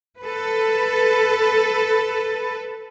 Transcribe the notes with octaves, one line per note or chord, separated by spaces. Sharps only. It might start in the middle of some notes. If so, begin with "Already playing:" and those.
A4 B4